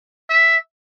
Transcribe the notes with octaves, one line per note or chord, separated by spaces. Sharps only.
E5